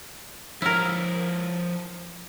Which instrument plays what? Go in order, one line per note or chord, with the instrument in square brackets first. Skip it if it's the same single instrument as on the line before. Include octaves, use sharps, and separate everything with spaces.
[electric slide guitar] F3 C#5 [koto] E4 A#4